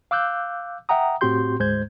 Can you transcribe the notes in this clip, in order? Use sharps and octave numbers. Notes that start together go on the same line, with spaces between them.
F5 D6 E6 F#6 G6
E5 F#5 G5 A#5 D#6
A2 C4 F#4 G4 C6 G6
D2 G#2 G#3 C5 G6 G#6